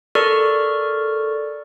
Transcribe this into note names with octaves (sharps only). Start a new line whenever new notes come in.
A4 A#4 D5 C#6 F6